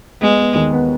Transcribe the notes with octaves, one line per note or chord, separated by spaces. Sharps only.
G#3 B3
B3
D#2
B3